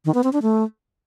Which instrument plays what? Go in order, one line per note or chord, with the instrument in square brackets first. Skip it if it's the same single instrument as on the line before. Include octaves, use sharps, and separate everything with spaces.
[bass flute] D#3
B3
C4
D4
A3